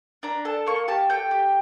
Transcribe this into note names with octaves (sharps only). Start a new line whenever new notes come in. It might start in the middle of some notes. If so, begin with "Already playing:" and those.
D4 A#5
A4 A5
A#3 C#6
G4 A5
A3 G5
G4